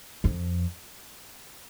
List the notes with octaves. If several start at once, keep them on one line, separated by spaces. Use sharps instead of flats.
F2